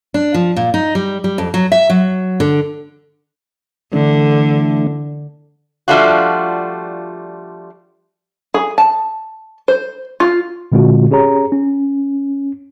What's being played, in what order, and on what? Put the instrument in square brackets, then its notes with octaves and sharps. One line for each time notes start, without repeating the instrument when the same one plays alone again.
[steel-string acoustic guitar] D4
F3
A#2
D#4
G3
G3
F2
F#3
E5
F#3
D3
[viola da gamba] D3 [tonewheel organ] E3 A3 D4
[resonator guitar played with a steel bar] F3 G3 A3 D4 F4 F#4
[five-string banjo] G#4
A5
C5
F4
[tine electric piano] A#2 D3 G#3 C4 F4 F#4
C#4 G4 G#4 C#5 A#5
C#4